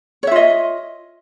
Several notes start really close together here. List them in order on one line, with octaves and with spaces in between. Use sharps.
C#5 E5 F4 D#5